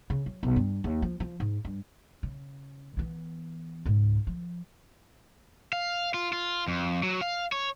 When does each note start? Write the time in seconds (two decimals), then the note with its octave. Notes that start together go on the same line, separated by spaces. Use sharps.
0.10 C#3
0.26 F#3
0.43 B1
0.56 G2
0.84 D#2
1.02 F3
1.20 F3
1.40 G#2
1.65 G2
2.23 C#3
2.97 E3 B3
3.85 C#2 G#2
4.27 F3
5.73 F5
6.14 F4
6.33 F4
6.68 F2
7.03 F#3
7.21 F5
7.52 C#5